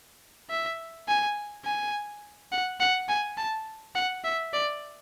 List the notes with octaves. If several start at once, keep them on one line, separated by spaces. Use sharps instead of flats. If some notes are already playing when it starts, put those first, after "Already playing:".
E5
G#5
G#5
F#5
F#5
G#5
A5
F#5
E5
D5